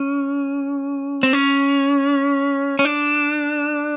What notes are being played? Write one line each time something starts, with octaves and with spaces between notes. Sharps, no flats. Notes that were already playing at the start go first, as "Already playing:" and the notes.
Already playing: C#4
C4
C#4
C#4
D4